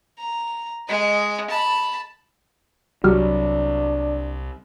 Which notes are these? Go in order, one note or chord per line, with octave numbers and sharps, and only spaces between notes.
A#5
G#3 D#5
A5 B5
C2 F#3 G3 D4 F#4 G4 C#6 F6